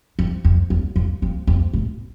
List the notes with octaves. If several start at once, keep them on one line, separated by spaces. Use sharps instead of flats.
F2
F2
E2
F2
F2
F2
A2